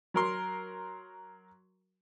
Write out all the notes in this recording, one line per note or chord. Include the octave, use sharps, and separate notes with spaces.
F#3 A#4 C6